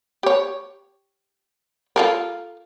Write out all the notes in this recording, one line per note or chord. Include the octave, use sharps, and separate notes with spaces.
G4 C#5
F4 A4 A#4